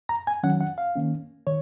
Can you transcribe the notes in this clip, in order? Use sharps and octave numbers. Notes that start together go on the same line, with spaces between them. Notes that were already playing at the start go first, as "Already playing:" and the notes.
A#5
G#5
D#3 F#3 C#4 F#5
F#5
F5
D#3 A#3 C#4
D#3 C#5